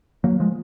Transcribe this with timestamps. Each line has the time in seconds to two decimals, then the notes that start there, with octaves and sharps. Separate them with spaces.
0.24 F#3 A#3
0.40 F3 G#3